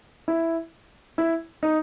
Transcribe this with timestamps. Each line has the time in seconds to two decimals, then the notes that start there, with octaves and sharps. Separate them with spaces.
0.28 E4
1.18 E4
1.63 D#4